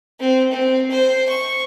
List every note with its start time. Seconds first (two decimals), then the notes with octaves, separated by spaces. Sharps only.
0.20 C4
0.51 C4
0.91 C5
1.28 C#6